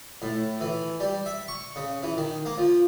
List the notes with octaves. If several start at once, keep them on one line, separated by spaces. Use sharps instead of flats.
A2
E3
G3
E5
C#6
C#3
E3
D#3
A#3
F3